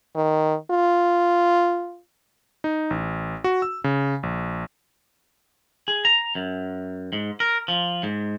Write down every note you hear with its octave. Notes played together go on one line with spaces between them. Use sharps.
D#3
F4
D#4
A1
F#4
E6
C#3
A#1
G#4
A#5
F#2
G#2
A#4
F3
G#2